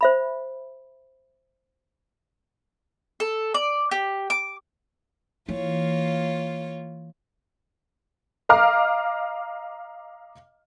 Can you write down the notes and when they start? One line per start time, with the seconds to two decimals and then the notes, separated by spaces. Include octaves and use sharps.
0.01 C5 E5 B5
3.20 A4
3.54 D5
3.91 G4
4.30 D6
5.49 E3 A#3 F4 C#5
8.49 D#5 F5 A#5 D6 F6